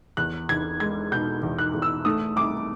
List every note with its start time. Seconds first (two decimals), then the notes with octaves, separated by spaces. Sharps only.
0.17 E2 F#6
0.49 E2 G#6
0.80 G#3 G#6
1.12 B2 G6
1.43 E2
1.58 F#6
1.74 E2
1.82 E6
2.05 A3 D#6
2.36 C2 D6